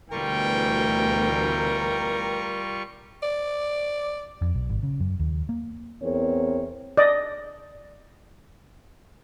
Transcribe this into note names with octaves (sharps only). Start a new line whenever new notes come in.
D2 B2 E3 G3 F4 A#4 G5 C#6
D5
F2
B1
G#1
C#3
F#2
D#2
A#3
E2 B3 C4 A#4 C#5
D5 D#5